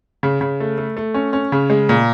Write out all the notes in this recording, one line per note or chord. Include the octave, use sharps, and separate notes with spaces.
C#3
C#3
A3
A3
A3
C#4
C#4
C#3
G#3
A#2